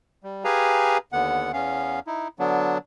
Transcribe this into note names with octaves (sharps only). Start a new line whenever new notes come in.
G3
G4 G#4 B4 F5 G#5 A#5
D#2 D3 B3 F#5
E2 B3 C#4 F5
D#4 E4
D3 F#3 B3 D4